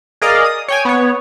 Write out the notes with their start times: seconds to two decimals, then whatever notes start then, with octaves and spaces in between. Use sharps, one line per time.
0.22 G#4 A#4 D5 D#5 F5 A#5
0.44 D#6
0.68 C#5 G5 G#5
0.85 B3 C#5